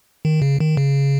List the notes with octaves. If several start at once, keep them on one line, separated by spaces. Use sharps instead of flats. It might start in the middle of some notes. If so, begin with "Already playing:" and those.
D#3
C#3
D#3
C#3